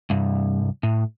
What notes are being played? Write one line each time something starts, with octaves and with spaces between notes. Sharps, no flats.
C2 G2
A2